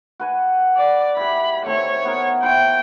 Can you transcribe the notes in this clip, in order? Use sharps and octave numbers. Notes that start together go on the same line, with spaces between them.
F#4 B4 G#5
D5
E4 G4 B5
D#3 A3 C4 C#5
B3 F#4 A#4
E4 C5 C#5 G5